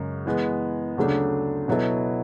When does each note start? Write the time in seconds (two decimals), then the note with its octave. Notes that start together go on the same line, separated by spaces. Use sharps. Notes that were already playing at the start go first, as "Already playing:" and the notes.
Already playing: F#2 C#3 G#3
0.26 E3 G#3 B3
0.97 D2 C#3 F#3 A3 D4
1.68 B2 F#3 B3 E4 A4